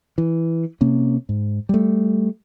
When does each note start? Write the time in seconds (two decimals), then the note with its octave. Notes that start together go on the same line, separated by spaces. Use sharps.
0.18 E3
0.81 C3 A#3 C#4
1.29 G#2
1.69 G3 A3